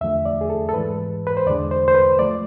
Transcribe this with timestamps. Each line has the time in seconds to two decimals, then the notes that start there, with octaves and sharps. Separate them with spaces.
0.01 E2 D3 F3 A3 E5
0.25 D5
0.41 G#4
0.50 A4
0.69 A4
0.74 G#2 E3 G#3 B4
1.27 B4
1.37 C5
1.46 E2 D3 G#3 D5
1.71 C5
1.88 C5
1.95 B4
2.19 F3 A3 D5